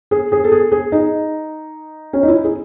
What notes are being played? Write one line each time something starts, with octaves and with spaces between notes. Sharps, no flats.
G#4
G#4
A4
G#4
G#4
D#4
C#4
D#4
E4
G#4